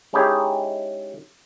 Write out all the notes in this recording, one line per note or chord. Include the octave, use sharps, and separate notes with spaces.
G#3 C#4 D#4 E4 G4 G#4